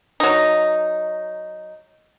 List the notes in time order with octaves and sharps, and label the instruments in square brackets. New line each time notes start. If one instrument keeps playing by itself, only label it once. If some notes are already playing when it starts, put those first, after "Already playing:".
[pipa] F#3 D#4